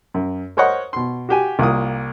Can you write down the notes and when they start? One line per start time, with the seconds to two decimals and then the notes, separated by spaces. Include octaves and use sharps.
0.14 F#2
0.57 A#4 C5 C#5 D#5 F#5 C#6
0.93 B2 C6
1.29 F#4 G4 G#5
1.59 C2 A#3 F4 D#6